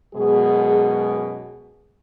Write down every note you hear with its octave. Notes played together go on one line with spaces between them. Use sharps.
F#2 B2 G#3 G#4